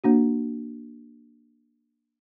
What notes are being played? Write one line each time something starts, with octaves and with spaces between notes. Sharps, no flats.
A#3 D4 F#4